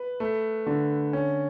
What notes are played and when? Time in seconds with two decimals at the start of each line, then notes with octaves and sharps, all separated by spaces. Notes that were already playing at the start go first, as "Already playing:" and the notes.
Already playing: B4
0.20 A3
0.66 D3
1.13 C#4